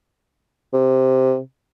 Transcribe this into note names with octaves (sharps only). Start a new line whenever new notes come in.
C3